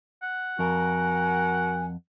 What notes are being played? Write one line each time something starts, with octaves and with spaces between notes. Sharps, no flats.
F#5
F2 F#4 A#4 G#5